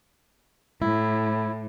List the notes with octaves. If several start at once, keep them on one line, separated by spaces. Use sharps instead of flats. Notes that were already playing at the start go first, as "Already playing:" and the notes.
A2 E4